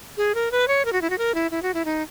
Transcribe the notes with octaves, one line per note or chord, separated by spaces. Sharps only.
G#4
A#4
B4
C#5
A#4
F#4
E4
F#4
A#4
E4
E4
F#4
E4
D#4